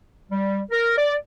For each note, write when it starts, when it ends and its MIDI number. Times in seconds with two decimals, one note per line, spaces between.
0.30 0.60 55
0.71 0.98 70
0.98 1.14 74